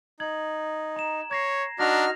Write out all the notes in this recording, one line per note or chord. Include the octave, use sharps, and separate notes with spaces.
D#4 G#6 F#7
A#5 E7
C#5 G#6 A#6 C7
D4 D#4 F#4 F6 A#6 F7